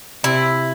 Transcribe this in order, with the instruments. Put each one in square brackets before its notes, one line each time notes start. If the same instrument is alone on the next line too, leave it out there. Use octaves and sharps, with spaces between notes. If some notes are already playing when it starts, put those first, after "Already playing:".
[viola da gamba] C3 [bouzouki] E4